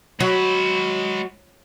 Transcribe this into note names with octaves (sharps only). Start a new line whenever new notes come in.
F#3 G#3 B5